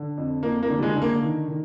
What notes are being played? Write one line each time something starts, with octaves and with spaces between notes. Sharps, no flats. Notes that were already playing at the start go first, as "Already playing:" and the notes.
Already playing: D3
F2
F2 A#3
A#3
D3
G3
G#3
D3
A#3
D#3
D#3